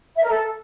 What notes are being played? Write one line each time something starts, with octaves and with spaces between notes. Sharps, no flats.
E5
A#4
A4